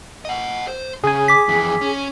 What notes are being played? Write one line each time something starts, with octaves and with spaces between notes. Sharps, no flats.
D#5 F#5
C5
C#3 G#4 G#5
D6 B6
F2 E3
C#4